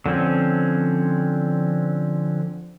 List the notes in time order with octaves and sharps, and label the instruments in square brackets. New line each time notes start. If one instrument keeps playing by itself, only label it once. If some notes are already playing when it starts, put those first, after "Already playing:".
[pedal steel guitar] D3 F3 C4 C#4